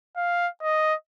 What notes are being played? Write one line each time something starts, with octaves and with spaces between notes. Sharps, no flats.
F5
D#5